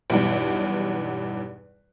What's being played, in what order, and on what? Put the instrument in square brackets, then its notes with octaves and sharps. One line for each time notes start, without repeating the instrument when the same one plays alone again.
[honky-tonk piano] B1 E2 G2